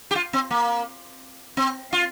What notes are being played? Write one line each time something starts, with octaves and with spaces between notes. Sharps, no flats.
G4
F4
C4
A#3
C4
F4